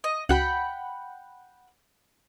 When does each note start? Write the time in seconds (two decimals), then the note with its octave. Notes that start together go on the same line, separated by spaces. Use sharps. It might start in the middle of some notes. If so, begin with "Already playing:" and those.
0.04 D#5
0.29 C#2 F#4 F#5 G5 B5